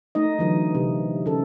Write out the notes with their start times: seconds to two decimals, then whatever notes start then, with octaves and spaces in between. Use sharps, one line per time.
0.15 A3 D#4 D#5
0.39 D3 E3 F#3
0.75 C3
1.26 C#3 A4